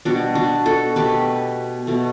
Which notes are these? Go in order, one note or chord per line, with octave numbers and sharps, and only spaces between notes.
B2 G3 B3 D4 F#4
D4 F#4
F#4 A4
B2 A3 G4 B4
B2 A3